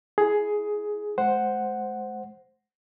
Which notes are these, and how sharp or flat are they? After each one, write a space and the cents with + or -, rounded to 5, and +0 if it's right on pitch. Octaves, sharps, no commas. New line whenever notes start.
E4 +0 G#4 +10
G#3 +40 C5 +0 F#5 +0